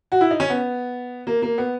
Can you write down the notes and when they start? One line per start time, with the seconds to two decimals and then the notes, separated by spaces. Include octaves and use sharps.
0.12 F#4
0.21 E4
0.31 D#4
0.40 C#4
0.50 B3
1.27 A#3
1.42 A#3
1.58 B3